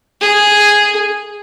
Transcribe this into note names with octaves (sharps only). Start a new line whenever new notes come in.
G#4